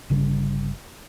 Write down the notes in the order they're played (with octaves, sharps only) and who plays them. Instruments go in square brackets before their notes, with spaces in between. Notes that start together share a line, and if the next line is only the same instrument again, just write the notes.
[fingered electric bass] G1 C#3 G3